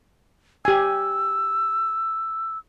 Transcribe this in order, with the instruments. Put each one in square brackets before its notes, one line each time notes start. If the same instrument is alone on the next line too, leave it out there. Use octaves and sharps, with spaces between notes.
[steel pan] G4 G#5 [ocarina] E6